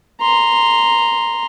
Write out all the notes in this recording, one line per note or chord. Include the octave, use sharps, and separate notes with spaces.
A#5 C6